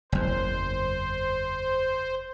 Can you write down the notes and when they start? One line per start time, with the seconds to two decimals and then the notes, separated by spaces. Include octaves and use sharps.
0.12 F#1 E2 C5